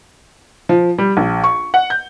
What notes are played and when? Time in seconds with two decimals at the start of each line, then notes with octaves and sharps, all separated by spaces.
0.69 F3
0.98 G3
1.17 A#1
1.44 C#6
1.74 F#5
1.90 G6